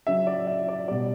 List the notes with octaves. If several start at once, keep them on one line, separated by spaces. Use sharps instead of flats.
C#3 F#3 E5
D5
E5
D5
B2 G3 D5